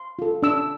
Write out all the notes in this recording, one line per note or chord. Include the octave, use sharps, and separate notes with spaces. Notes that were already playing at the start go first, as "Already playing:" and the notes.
Already playing: C6
F4 A4
D4 E6